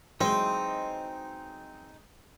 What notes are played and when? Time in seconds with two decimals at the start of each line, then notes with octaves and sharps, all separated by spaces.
0.21 E3 F#3 G#3 C4 D#4 C5 D#5 C6